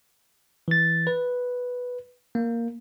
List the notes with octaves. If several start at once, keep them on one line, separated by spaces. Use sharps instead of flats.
E3 A6
B4
A#3